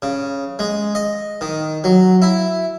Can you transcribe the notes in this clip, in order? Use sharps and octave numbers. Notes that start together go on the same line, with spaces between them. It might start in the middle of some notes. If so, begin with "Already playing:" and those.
C#3
G#3
D#5
D#3
F#3
E4